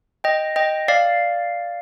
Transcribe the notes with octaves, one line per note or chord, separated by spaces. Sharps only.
D#5 G5
D#5 G5
D5 F5